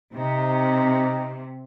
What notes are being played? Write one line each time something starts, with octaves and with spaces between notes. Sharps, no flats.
C3 D#4